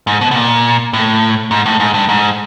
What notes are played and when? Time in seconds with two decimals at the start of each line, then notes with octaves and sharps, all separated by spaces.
0.07 G#2
0.21 B2
0.31 B2
0.35 A#2
0.93 A2
1.51 G#2
1.66 A2
1.80 G#2
1.94 G2
2.09 G#2